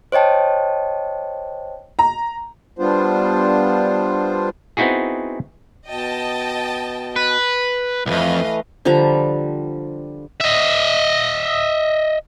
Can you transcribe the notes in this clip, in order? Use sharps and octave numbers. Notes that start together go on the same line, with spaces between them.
C5 C#5 D#5 G5 A5
A#5
G3 B3 D4 F4 C5
B3 C4 D#4 E4 F#4 G#4
B2 D#5 G5 A5
B4
C2 F2 E3 A3 B4 D#5 F5
D3 F3 G3 A#5
D#5 E5